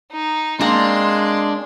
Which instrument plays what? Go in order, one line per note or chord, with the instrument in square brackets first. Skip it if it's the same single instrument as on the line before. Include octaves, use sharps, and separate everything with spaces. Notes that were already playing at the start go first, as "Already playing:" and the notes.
[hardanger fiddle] D#4
[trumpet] G#3 [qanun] A#3 C4 A#5 [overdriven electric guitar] D4 [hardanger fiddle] C6